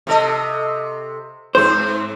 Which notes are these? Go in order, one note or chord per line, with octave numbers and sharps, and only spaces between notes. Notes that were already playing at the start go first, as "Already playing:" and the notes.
C3 A4 D#5
G#2 C4 C5